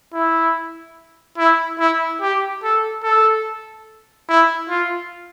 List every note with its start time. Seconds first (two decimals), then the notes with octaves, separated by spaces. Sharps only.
0.14 E4
1.38 E4
1.79 E4
2.21 G4
2.63 A4
3.03 A4
4.28 E4
4.70 F4